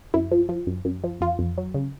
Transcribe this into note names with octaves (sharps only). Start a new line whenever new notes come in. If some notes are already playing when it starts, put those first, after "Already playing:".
F#2 E4
F3
F3
F#2
F#2
F3
F2 F4
F2
F#3
C#3